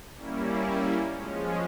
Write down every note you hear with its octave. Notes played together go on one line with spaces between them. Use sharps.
G3 A#3 C#4 E4
F3 G#3 C#4